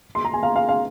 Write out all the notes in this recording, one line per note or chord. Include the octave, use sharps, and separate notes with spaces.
C6
A#5
G#5
F5
F5
F5